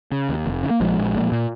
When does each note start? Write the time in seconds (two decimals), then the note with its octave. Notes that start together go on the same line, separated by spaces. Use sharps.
0.12 C#3
0.29 D#2
0.45 F1
0.63 C#3
0.70 A#3
0.80 A#1 F3 G#3
0.98 A#1
1.16 A#2
1.32 A#2